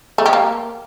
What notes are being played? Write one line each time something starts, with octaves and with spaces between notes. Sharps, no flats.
A3
G4
A#3